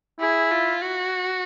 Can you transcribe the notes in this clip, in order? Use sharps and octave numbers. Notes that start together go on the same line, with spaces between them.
E4 G#4
F4
F#4